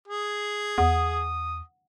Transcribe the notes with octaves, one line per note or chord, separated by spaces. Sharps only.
G#4
E2 F#5 D#6